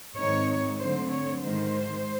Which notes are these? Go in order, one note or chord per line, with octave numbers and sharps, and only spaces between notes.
G#2 D#3 G#3 C4 D#4 C#5
D3 F#3 A3 C4 C5
C#5
G#2 D#3 G#3 C5